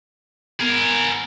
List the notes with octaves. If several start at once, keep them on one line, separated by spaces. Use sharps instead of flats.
B3 G#4 A#4